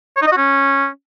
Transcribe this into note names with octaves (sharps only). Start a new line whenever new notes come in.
C#5
D#4
D#5
F#4
C#4